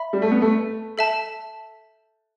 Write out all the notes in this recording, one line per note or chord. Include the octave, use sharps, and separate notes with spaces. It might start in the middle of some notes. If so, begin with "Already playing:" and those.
Already playing: E5 B5
G3
A3
B3
A3
A4 E5 A5